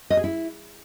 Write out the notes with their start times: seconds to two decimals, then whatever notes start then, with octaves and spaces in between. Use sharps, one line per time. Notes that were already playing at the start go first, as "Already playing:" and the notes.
0.10 D#5
0.17 G#4
0.24 E4